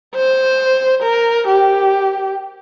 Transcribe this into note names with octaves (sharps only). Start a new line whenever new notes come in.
C5
A#4
G4